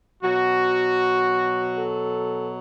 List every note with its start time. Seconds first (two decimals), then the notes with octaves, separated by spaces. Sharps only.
0.23 B2 F#3 F#4
1.76 A4